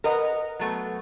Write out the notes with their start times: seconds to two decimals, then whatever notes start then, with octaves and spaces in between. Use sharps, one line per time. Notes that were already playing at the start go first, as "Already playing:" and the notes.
0.04 A#4 B4 D#5 F#5
0.59 F#3 A3 B3